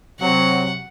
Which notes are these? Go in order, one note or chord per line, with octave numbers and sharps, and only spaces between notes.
C3 F#3 F#5